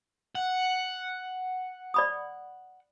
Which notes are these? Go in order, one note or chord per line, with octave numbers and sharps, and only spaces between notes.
F#5
D5 B5 D#6